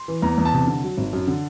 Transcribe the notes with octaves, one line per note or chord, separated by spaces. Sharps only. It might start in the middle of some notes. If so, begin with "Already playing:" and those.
Already playing: C6
E3
E2 A#5
E2
A5
C3
D3
F#3
G#1
F#2
D3